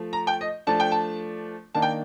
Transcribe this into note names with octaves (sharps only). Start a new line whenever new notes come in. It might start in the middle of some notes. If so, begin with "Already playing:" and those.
Already playing: F3 A3
A#5
G5
D#5
F3 A3 D4 A5
G5
A5
D#3 A#3 D4 A5
G5